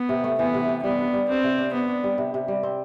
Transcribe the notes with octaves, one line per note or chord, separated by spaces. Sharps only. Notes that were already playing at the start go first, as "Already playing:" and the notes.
Already playing: B3
C3
A3
E3 B3
C3
C3
G3 B3
D4
G3
C4 D4
C3
D4
B3 D4
D4
G3
C3
C3
G3
C4